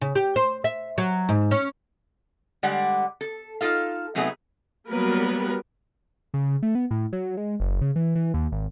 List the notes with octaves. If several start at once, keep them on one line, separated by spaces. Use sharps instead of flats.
C#3
G4
C5
E5
F#3
G#2
C#4
D3 G3 G#3 D5 F#5
A4
D#4 F4 A4 F5
C3 F#3 A3 B3 D#4 G#4
F#3 G3 A#3 B3 A#4 B4
C#3
A3
B3
A2
F#3
G#3
F#1
C#3
E3
E3
D#2
G#1